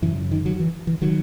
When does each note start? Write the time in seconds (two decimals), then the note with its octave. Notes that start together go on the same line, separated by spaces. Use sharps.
0.02 F#2 C#3 E3
0.32 D#3
0.45 D#3 F#3
0.60 E3
0.87 E3
1.02 D#3 F#3